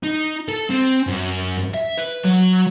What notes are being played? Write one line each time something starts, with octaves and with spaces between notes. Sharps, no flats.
D#4
A4
C4
F#2
E5
B4
F#3